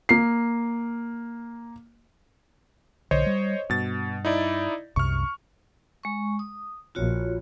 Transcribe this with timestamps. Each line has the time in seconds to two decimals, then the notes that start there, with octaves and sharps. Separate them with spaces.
0.09 A#3 C7
3.11 B1 D3 C5 C#5 D#5
3.26 G3
3.70 G2 B2 A6
4.25 D#4 E4 D5
4.96 C2 F#2 C3 C#6 F6
6.03 G#3 C#6
6.39 D#6
6.95 A#1 F4 F#4 C#5